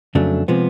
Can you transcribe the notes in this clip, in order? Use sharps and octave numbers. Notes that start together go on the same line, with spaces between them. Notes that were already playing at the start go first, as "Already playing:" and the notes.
F2 C#3 F#3 A3 D4
C3 F3 G#3 B3